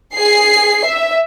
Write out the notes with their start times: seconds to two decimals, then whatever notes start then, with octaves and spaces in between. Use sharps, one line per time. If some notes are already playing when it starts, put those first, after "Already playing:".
0.14 G#4 C7
0.85 E5